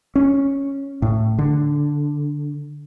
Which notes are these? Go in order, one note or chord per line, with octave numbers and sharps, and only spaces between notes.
C#4
A2
D3